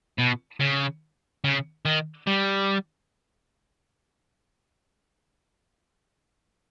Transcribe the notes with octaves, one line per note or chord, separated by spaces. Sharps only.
B2
C#3
C#3
D#3
G3